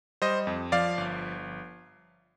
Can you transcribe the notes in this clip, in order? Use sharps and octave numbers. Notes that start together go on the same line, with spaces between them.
G3 C5 D#5
F2
F3 D5 F5
G1